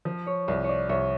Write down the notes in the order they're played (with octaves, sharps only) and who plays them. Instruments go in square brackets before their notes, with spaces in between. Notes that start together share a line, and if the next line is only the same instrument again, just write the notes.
[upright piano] F3
[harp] C#5
[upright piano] C2 [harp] D5
[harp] C#5 D5
[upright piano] C2 [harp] C#5